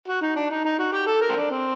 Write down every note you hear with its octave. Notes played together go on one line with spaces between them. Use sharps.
F#4
D#4
D4
D#4
D#4
F#4
G4
A4
A#4
C4
D4
C4